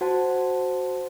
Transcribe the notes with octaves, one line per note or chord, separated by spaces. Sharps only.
F#4 C5 F#5 A5